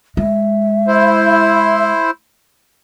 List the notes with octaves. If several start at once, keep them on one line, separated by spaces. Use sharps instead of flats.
G#3 E5
E4 C5